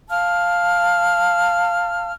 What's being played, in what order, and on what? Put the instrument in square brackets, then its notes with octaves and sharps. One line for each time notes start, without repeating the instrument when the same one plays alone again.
[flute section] F5 A5 F6